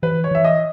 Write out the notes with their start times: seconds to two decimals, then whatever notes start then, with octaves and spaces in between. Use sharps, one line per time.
0.02 E3 B4
0.24 C#5
0.31 E3 E5
0.45 D#5